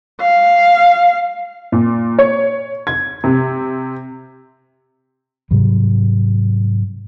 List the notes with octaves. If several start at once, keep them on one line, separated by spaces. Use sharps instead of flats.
F5
A#2
C#5
G#6
C3
G#2 C3 F#3 G3